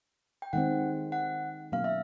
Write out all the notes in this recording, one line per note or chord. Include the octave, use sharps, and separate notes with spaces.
G5
D#3 G#3 C4 F#5
F#5
B2 F#3 A#3 C#4 F5
E5